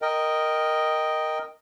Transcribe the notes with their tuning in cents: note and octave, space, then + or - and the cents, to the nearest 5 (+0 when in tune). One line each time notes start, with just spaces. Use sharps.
A#4 +0 D#5 +0 G5 +0